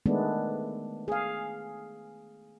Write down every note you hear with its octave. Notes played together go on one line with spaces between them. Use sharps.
D#3 G#3 A3 B3 D4
G#4 F5